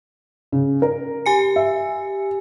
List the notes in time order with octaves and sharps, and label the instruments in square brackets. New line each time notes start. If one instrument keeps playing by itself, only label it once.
[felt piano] C#3
A#4
[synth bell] G4 G#5 C#7
[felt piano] E5